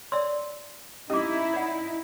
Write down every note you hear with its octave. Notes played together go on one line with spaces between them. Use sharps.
C#5 D5 C6 E6
C#4 D#4 E4 G4 D#5 D6
C#5 D5 F#5